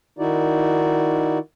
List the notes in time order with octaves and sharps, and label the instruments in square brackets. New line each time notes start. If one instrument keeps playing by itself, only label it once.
[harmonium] D#3 D#4 E4 F#4 D5